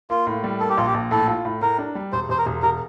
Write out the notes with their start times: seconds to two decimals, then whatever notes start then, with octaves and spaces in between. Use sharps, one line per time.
0.10 A#3 F4
0.27 A2
0.44 G3
0.60 A#3 A4
0.70 G4
0.77 A#1 F4
0.87 G4
0.94 A#1
1.11 A2 A4
1.28 F4
1.45 A2
1.61 A2 A#4
1.78 D4
1.95 G3
2.12 E1 C5
2.29 E1 C5
2.38 A#4
2.46 E1
2.62 E1 A#4